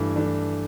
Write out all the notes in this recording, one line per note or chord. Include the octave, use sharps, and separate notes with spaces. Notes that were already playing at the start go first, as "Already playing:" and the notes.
Already playing: G2 E3 A3 D4
E3 A3 D4